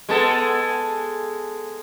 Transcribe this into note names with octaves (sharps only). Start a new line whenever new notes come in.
G#3 B3 A4